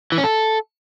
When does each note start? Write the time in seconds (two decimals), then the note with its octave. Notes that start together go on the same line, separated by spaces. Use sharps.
0.12 E3
0.18 C#4
0.24 A4